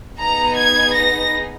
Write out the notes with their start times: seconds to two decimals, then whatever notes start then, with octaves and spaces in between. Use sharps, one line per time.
0.17 B3 D#4 G#4 A#5
0.55 G#6
0.93 A#6